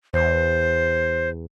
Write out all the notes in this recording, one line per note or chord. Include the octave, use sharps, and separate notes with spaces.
E2 C5